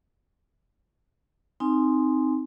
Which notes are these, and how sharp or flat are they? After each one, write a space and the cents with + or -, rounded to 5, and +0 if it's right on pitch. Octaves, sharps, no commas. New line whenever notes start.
C4 +0 D#4 +0 G#5 +0